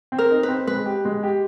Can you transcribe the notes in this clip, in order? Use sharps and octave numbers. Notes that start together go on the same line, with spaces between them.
C4
A#4
D#4
B4
C4
G#3 B4
G4
G#3
G4